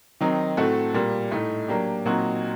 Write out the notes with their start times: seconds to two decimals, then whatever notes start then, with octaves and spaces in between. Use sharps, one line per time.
0.21 D#3 F#3 C4 D#4
0.57 A2 A3 C4 F#4 A4
0.94 A#2 G3 A#3
1.31 A2 A3 D#4
1.68 F#3 A#3 D4 G4
2.05 A#2 F#3 C4 D#4 F#4